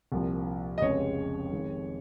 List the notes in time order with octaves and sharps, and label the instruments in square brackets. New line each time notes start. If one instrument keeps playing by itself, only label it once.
[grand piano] C2 A#2 F3
D#5
F1 F2 C#3 G#3 C#5
F2 D#3 G#3